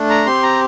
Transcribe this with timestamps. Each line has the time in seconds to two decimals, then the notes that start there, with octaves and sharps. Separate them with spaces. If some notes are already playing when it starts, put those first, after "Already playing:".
Already playing: A3 D4
0.10 A#5
0.26 C4 G4 C6
0.43 A#5